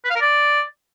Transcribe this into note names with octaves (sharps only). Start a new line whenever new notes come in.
B4
F5
A#4
D5